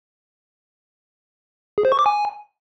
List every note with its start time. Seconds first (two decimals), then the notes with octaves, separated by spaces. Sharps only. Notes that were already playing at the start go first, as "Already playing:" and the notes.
1.78 G#4
1.85 C5
1.92 C#6
1.99 D6
2.06 G#5